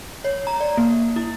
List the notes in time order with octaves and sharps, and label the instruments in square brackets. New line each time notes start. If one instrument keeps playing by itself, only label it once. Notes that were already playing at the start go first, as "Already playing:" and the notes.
[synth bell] C#5
A#5
D5
A#3
E4